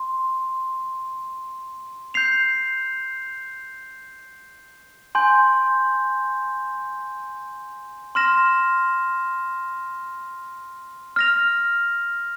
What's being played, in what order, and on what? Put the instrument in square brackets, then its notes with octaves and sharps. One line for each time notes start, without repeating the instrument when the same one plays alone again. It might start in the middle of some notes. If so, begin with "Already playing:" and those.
Already playing: [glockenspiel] C6
G6 C7 F7
G#5 C6 G6
C6 F6 A#6 E7
F6 A#6 F7